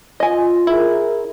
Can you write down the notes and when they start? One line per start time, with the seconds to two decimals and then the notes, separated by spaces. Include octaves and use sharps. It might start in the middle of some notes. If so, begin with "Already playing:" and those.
0.20 F4 D#5 G#5
0.67 E4 G#4 A#4